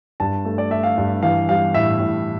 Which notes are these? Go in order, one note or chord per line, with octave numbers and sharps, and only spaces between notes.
G2 A5
A3
D5
A3 E5
F5
G2
E3 F5
G3 F5
A2 E5
A2